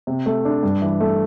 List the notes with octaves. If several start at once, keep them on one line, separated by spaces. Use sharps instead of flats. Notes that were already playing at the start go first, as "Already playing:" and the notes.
C3
A3
D4
G2
E3
A3